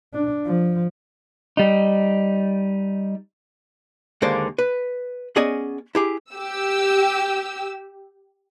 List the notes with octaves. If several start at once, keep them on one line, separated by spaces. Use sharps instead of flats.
D4
F3
G3 D#4
D#2 D3 G#3 A#3 C5 D5
B4
B3 C#4 G#4 D5 D#5 G#5
E4 G4 G#4
G4 E6